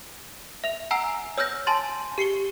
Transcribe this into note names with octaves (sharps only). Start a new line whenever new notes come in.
E5 F7
F#5 G#5 A#5 E6 C7
C#5 E6 F6 G6 A#6
G#5 A5 C6 A6
G4 C7 C#7 G7